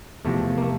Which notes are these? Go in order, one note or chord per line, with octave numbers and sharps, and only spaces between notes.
E2 C3 F3 A3
A#3
A3